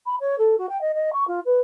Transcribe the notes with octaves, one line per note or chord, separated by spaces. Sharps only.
B5
C#5
A4
F#4
G5
D#5
D#5
C#6
F4
B4